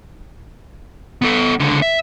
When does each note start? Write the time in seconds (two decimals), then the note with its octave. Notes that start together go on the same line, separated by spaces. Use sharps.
1.22 B3 A4
1.59 C#2 D3
1.82 E5